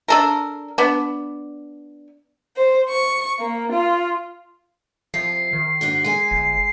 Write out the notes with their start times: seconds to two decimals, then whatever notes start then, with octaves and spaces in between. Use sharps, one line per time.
0.08 D4 A4 A#4
0.78 B3 D4
2.56 C5
2.88 C#6
3.38 A#3
3.72 F4
5.14 C3 F3 F4 C7
5.53 D#3
5.81 G#2 D4 F#4
6.04 G#3 A4 G#5
6.31 G1